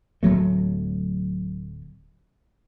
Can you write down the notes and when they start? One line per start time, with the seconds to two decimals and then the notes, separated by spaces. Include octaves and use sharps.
0.23 D1 F#3 A3